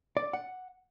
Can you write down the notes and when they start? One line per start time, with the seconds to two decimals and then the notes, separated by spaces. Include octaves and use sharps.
0.17 D5
0.33 F#5